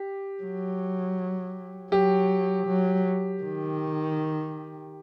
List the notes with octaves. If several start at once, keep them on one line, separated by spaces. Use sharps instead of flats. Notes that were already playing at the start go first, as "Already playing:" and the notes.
Already playing: G4
F#3
F#3 G4
F#3
D#3